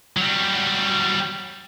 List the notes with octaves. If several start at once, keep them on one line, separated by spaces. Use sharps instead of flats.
F#3 G3